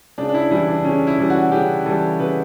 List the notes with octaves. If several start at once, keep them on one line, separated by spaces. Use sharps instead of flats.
C#3 D4
D4
E4
E3 G3 E4
D4
C#3 C#4
E4
E3 G3
F#4
C#3 G4
E3 G3 A4
C#3 B4